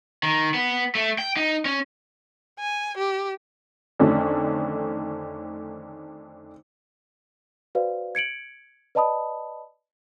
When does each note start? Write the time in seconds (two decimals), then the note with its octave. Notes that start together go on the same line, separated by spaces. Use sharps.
0.23 D#3
0.54 B3
0.95 A3
1.18 G5
1.37 D#4
1.65 C#4
2.59 G#5
2.97 G4
4.00 F2 D3 D#3 A3 C#4
7.75 F#4 B4 C5 D5 F5
8.15 G#6 C#7 D7 F#7
8.95 B4 D5 D#5 A5 B5 D#6